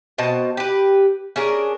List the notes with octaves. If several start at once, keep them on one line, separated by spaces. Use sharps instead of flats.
B2 C4 D#5 A5
G4 B4
C#4 D4 G#4 A#4